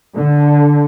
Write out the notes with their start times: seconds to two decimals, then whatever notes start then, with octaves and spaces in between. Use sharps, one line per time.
0.17 D3